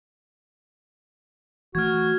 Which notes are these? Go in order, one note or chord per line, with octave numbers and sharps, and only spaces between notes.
E3 A3 F#4 F6 G#6